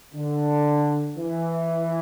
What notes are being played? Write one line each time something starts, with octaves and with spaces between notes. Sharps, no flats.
D3
E3